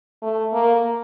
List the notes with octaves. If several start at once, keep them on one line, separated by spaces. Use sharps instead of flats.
A3
A#3